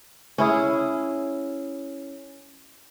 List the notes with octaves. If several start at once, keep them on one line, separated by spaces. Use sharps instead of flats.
C#4 E4 G#4